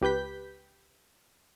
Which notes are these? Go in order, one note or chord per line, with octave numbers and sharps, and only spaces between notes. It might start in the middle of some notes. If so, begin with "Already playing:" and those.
C#2 G4 B4 G6 B6